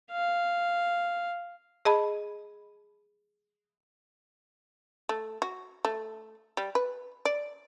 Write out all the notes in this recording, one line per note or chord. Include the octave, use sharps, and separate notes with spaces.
F5
G#4 D#5 A5 B5
A3
F#4
A3
G3
B4
D5